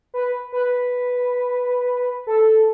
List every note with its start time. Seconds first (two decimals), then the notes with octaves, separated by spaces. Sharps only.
0.14 B4
0.52 B4
2.27 A4